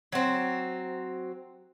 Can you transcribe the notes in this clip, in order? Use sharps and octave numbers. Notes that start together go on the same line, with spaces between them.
F#3 C4